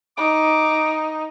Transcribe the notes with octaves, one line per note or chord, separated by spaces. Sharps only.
D#4 D6